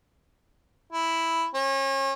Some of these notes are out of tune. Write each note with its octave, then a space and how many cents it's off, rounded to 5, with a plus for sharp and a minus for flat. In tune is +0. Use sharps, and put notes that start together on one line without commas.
E4 +0
C#4 -35